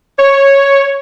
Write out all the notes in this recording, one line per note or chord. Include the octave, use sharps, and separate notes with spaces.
C#5